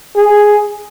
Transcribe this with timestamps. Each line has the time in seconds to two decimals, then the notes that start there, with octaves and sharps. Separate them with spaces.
0.16 G#4